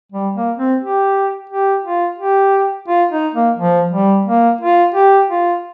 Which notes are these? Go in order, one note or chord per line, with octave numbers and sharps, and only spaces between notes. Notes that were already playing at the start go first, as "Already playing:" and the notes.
G3
A#3
C4
G4
G4
F4
G4
F4
D#4
A#3
F3
G3
A#3
F4
G4
F4